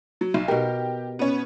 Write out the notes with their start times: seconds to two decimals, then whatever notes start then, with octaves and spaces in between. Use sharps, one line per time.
0.21 F#3
0.34 B1
0.48 B2 G4 A#4
1.19 B3 C#4